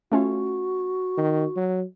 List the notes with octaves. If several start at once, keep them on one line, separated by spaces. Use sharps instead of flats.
A3 C#4 F4 F#4
D#3
F#3